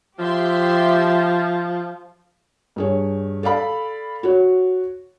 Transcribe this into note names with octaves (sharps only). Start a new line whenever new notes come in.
F3 G4 E5 C6
G2 G#4 C#5
A4 D5 F5 B5
F#4 C#5